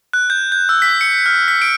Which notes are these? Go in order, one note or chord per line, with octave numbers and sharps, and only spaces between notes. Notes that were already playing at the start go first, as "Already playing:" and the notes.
F#6
G6
G6
E6
B6
C#7
F6
B6
D7